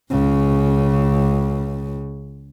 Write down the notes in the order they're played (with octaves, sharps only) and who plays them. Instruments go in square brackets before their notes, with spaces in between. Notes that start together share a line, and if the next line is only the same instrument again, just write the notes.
[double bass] C#2 C#3